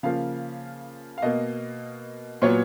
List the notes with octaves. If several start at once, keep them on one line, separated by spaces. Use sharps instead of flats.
C#3 F3 A#3 F5
F5
B2 A#3 D#5
A#2 F#3 B3 C#5